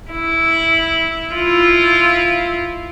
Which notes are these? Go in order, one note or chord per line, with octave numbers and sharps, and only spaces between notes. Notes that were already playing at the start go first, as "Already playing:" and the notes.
E4
E4 F4